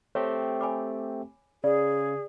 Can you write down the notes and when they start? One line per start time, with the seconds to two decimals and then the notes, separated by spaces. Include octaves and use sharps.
0.15 A3 C4 G4 C#5
0.61 G#5 B5 D6
1.64 C#3 G#4 D5